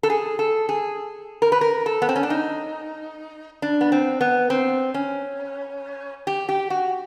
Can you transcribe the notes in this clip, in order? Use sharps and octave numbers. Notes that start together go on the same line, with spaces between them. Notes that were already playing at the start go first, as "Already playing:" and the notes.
A4
G#4
A4
G#4
A#4
B4
A#4
A4
B3
C4
C#4
D4
D#4
D4
B3
C4
B3
C4
C#4
G4
G4
F#4